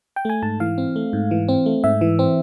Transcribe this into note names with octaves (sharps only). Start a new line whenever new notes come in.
G5
A3 G#5
G#2 A5
E3 F5
C4
A3
G#2
E3
C4
A3
G#2 E5
E3
C4